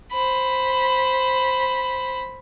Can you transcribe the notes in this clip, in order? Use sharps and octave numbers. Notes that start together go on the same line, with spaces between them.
C5 B5